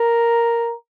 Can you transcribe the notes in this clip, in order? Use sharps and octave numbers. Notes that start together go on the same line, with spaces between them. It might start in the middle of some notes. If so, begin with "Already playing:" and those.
Already playing: A#4